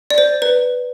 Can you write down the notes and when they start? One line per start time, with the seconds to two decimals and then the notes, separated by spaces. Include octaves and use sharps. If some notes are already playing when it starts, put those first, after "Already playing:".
0.11 D5
0.18 C5
0.42 B4